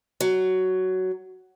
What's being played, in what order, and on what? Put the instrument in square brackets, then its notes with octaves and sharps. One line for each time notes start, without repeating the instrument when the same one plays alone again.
[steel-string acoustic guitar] F#3